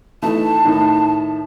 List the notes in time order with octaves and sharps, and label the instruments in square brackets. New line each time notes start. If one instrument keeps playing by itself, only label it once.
[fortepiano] E3 A3 D#4 [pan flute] A5
[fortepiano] A2 D#3 D#4